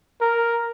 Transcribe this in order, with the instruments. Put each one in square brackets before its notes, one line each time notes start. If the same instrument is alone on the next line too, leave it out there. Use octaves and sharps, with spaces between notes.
[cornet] A#4